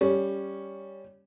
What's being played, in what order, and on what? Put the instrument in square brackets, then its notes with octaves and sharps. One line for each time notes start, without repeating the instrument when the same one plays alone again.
[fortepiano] G3 C#4